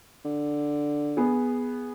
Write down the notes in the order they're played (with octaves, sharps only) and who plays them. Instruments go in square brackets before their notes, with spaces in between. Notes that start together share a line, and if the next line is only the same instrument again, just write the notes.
[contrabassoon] D3
[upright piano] B3 G#4